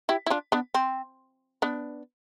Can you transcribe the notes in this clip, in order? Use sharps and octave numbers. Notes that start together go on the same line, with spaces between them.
E4 G4
E4
D4 F4
B3 D4
C4
B3 D4